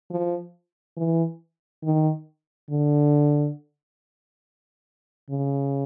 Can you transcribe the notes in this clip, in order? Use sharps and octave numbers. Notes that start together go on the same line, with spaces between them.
F3
E3
D#3
D3
C#3